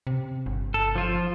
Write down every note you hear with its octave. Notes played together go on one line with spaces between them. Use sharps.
C3
G1
A4
F3 F4